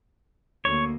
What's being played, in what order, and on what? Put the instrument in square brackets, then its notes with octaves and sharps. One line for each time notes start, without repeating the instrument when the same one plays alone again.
[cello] D2 A#3 [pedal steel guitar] C#5